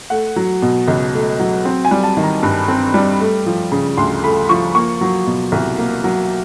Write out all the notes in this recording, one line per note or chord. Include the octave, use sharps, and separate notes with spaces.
A3 F#5
F#3
B2
C#2
A3
F#3
C4
G#5
G3
A5
D#3
A#5
G2
C4
G3
A3
F3
C#3
D2 C6
A3 B5
F3 C#6
A#3 C#6
F#3
B2
C2
A#3
F#3